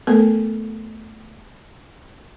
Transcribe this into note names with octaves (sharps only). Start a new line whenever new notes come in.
A3 B3 A4 A#4